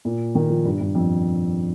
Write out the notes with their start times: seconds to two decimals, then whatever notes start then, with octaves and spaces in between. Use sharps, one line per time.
0.05 A#2
0.35 D#3
0.50 F3
0.65 G2
0.80 G2
0.95 F2